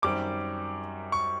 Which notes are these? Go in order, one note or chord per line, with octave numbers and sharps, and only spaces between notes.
F#2 D#3 G3 C4 D6
C#6